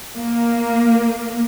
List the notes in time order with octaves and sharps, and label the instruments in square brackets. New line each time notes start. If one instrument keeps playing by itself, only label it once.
[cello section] A#3